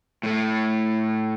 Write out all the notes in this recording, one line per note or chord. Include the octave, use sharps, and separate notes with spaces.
A2 A3